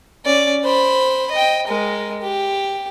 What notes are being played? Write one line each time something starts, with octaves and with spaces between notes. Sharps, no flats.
C#4 D5
C5 B5
D#5 G5
G#3 A#4
G4